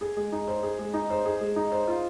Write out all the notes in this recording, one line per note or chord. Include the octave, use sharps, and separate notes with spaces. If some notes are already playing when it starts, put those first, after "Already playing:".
G#4
G#3
D#4
C5
G#4
G#3
D#4
C5
G#4
G#3
D#4
C5
F4